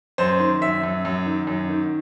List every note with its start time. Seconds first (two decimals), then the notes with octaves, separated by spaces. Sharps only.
0.18 F#2 C5
0.40 D#3
0.61 F#2 E5
0.83 F#2
1.05 F#2
1.26 D#3
1.47 F#2
1.70 D#3